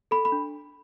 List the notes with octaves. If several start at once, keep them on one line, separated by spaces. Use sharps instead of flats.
A4 B5
B5
D4